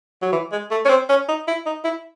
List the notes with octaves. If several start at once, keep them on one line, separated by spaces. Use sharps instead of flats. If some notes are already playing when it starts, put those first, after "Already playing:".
F#3
E3
G#3
A3
C#4
C4
C#4
D#4
E4
D#4
E4